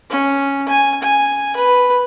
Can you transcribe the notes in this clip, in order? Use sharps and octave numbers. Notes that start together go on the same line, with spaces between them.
C#4
G#5
G#5
B4